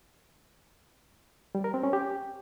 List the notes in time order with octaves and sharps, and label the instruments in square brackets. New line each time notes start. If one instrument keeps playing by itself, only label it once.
[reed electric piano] G3
A#4
C4
C#4
G4